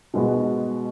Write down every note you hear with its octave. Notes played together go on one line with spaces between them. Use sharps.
B2 G#3 B3 F#4